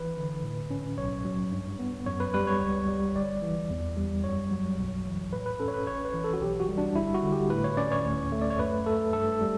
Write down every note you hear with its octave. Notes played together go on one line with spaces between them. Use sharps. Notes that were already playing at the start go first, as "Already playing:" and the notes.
Already playing: G1 E3 B4
D3
A2
C#4
B1 C#5
F#3
G2
B3
F#2 C#5
B4
G3 B4
C#5
C#2
G3
G1 D5
E3
E2
G3
F#2 C#5
F#3
B1
E3
A2 B4
B4
C#4 A4
C#5
B4
A1 C#5
B4
E3
A4
F#4
B1 G4
F#4
G3
D4
G1 E4
F#4
D3
G4
A2 B4
C#5
C#4 D5
C#5
D2
A3
D5
C#5
F#2 B4
A3 A4
G2 A4
A4
G3